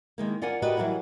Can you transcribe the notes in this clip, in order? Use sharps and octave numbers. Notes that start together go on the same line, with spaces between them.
D#3 G#3 A#3
F4 A#4 D5 F#5 G#5
F#4 G4 A#4 B4 D5 D#5
E3 F#3 G3 A#4 F#5